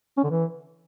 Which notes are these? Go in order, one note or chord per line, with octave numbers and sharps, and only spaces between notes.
C#4
D3
E3